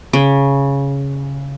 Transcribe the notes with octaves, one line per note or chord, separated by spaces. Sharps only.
C#3